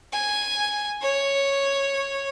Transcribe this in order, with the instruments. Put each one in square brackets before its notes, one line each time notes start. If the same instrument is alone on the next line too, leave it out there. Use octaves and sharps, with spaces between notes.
[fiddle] G#5
C#5